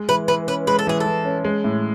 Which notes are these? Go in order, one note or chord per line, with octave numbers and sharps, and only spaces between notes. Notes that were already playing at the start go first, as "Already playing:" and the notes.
Already playing: G#3
E3 B4
E3 B4
C#4 B4
G#3 B4
A4
E3 G#4
A4
E3
C#4
G#3
A2